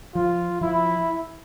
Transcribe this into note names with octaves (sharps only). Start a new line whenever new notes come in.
F3 F4
F3 E4